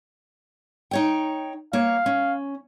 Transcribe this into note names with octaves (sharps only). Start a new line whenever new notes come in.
D#4 C#5 G5
A#3 C#5 F5
C#4